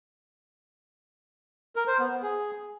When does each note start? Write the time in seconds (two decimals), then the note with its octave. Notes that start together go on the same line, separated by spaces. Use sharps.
1.76 A#4
1.88 C5
1.99 B3
2.11 B3
2.23 G#4